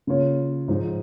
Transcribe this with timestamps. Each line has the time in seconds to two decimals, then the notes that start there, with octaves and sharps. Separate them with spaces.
0.07 C#3 A#3 F4 C#5
0.68 G#2 F3 G#3 D#4